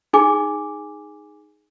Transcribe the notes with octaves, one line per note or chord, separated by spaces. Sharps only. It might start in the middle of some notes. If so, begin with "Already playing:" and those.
D#4 G#4 G#5 D6